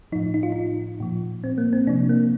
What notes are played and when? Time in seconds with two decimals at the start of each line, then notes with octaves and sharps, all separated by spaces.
0.12 A2 F3 D#4
0.34 D#4
0.43 F4
0.52 D#4
1.00 A#2 F3
1.44 C4
1.58 A#3
1.73 C4
1.87 C3 F3 D4
2.09 A#3